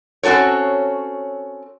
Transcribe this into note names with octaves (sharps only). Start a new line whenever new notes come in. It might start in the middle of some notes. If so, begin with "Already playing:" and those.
C4 C#4 F#4 A4 C#5